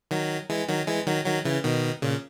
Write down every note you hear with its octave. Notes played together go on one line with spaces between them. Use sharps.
D#3 F#3
E3 G#3
D#3 F#3
E3 G#3
D#3 F#3
D#3 F#3
C#3 E3
B2 D#3
A#2 C#3